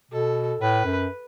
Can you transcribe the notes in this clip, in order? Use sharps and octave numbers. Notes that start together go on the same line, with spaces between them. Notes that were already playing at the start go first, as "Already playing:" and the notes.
B2 A4
A2 B4
F#2